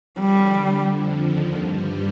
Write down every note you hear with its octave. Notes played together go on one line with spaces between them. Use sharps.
D3 G3
F2 F3
D#2 D#3
G2 G3